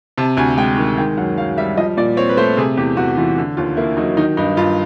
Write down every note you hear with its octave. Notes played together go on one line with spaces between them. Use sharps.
C3 A5
D2 G#5
G#3 G5
D#3
D#3 G5
F#2 F#5
F#2 F5
G3 E5
F3 D#5
A#2 D5
C4 C#5
B4
A3 C5
C3 G#4
E2 G4
E2 F#4
E3 F4
D3
D#2 F4
A#3 E4
F#3 D#4
D#3 D#4
G2 D#4
G2 F4